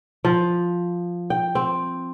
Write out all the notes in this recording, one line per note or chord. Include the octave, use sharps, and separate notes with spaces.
F3
G5
C4